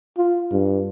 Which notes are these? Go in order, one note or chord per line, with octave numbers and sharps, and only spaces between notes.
F4
G2